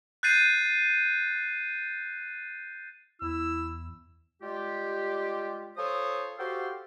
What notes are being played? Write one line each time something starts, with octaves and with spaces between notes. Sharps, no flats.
F#6 G6 A6 C7 D#7
E2 E4 E6
G3 G#3 F4 G4
F3 A4 C5 C#5 D#6
F#4 G4 A4 C5 F5 G5